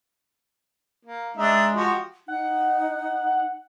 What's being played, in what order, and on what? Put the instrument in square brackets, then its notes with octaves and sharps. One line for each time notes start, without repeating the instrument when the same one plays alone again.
[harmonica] A#3
[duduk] G#3 [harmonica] D4 D#4 E5
[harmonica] F3 F#4 G4
[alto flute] D#4 [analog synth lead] F#5